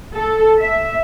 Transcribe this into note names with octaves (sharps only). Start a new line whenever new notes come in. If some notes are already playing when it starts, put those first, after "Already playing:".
A4
E5